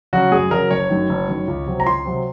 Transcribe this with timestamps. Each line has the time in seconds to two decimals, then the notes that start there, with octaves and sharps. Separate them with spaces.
0.13 C#3 F#3 C#4 F#4
0.32 F#2 G#4
0.51 C#3 F#3 C#4 A#4
0.71 F#1 C#5
0.90 F#2 D#3
1.09 F#1
1.28 F#2 D#3
1.48 C#2
1.66 C3 F#3 C4
1.80 A#5
1.86 C#2 C6
2.05 C3 F#3 C4